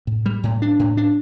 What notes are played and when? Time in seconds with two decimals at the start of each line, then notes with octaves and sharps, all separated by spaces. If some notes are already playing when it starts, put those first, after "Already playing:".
0.07 A2
0.26 G3
0.43 A2
0.62 D4
0.79 A2
0.97 D4